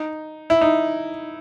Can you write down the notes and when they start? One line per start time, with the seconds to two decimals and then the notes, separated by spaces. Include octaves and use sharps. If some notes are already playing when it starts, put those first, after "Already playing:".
Already playing: D#4
0.50 E4
0.61 D#4